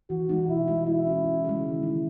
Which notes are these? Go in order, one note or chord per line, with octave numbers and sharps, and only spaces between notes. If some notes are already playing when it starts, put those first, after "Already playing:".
E3 F#4
G#3 D#4
B2 E4
G#3 D#4 F#4
G#3 E4
C#4 F#4
C#3
G#3 C#4 G#4
D#3
G#3 D#4